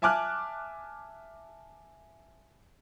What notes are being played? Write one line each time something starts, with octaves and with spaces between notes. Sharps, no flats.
E5 G#5 A5 D6 F6 F#6